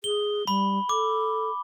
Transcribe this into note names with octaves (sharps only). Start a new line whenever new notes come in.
G#4 G7
G3 B5
A4 D6